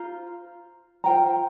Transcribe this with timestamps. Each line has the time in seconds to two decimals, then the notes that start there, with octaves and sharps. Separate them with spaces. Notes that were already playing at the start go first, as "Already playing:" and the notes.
Already playing: F4 C5 A#5
1.04 F4 C5 G5 A#5